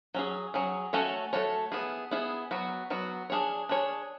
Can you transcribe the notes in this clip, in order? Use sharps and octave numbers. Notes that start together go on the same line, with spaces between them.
F#3 C#4 G#4
F#3 C#4 G#4
A3 C#4 F#4 A4 C#5
A3 C#4 F#4 A4 C#5
B3 E4 G#4
B3 E4 G#4
F#3 B3 F#4
F#3 B3 F#4
D4 G#4 C#5
D4 G#4 C#5